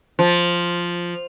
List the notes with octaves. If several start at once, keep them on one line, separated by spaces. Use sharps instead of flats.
F3